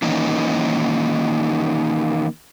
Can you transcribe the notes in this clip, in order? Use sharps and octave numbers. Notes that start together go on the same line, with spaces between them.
D#3 E3 A#3 C#4 D#4